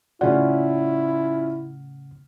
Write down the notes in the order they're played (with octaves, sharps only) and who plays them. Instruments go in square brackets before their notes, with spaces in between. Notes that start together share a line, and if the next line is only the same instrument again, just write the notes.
[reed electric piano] A2 C#3 F#5 [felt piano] C#4 F4 [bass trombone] E4 [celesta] D5